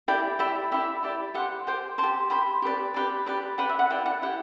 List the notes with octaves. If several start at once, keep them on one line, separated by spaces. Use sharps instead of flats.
E4 G4 D5 G5
E4 G4 D5 E5
E4 G4 D5 E5
E4 G4 D5
G4 C5 F#5
G4 C5 G5
C5 A5
G4
G4 C5 B5
G4 B4 D5
G4 B4 D5
G4 B4 D5
G4 B4 D5 F#5
E5
F#5
E4 G4 D5 G5
F#5
E4 G4 D5 F#5